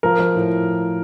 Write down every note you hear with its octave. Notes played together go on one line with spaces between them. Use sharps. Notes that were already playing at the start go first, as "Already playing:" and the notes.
F3 A#4
F3
A2